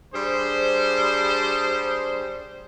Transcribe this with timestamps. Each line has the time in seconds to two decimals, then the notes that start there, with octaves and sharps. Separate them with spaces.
0.14 G3 D4 G#4 C5